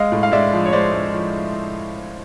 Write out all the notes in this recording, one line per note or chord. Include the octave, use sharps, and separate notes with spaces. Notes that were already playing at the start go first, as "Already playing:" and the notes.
Already playing: G#3 D#5 F5
A2
F5
G#3 D5 E5
F3
C#5
G#3 C5 D5
G#3
F3